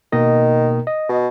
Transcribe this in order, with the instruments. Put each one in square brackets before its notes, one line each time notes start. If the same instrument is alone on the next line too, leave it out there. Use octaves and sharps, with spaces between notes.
[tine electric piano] B2 A#3 D#5 [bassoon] D#3
[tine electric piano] D#5
[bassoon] B2